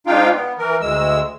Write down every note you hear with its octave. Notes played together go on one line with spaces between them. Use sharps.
G#2 D4 D#4 F4 F5 G5
B3
E3 A#4
D2 G#3 E6